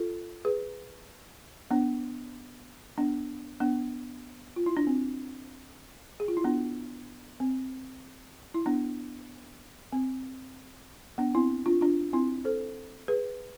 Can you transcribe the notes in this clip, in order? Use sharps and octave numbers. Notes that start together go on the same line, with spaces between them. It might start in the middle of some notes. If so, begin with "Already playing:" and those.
Already playing: F4 A4
G#4 B4
B3 D4
B3 D4
B3 D4
F4
E4
D4
C4
G#4
F4
E4
B3 D4
C4
E4
B3 D4
C4
B3 D4
C4 E4
D4 F4
D4 F4
C4 E4
A4 C5
G#4 B4